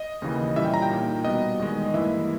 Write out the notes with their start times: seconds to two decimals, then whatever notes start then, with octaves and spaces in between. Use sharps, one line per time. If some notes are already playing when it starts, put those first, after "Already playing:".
Already playing: D#5
0.22 D#2 C#3 E3 A#3
0.56 A#2 G3 C#4 E4 E5
0.65 G5
0.74 A#5
0.82 G5
0.90 A#2 A#3 D#4
1.25 B2 G3 B3 D#5
1.59 E2 D#3 G#3
1.94 G2 E3 A#3 E4 E5